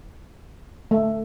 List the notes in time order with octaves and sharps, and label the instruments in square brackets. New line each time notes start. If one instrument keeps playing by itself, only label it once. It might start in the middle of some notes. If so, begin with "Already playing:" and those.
[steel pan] A3